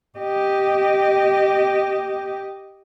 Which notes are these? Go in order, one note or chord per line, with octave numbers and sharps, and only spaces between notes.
G4 D#5